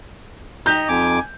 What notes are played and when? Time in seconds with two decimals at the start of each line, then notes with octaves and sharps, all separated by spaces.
0.66 D#4 G4 D#5 G6
0.88 F2 G#5 D6